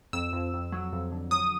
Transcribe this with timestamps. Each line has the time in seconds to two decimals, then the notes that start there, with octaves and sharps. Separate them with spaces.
0.13 F2 E6
0.33 F2
0.53 F2
0.72 F#3
0.93 F2
1.12 D3
1.31 F#3 D#6